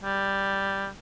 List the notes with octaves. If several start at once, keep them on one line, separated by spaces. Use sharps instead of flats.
G3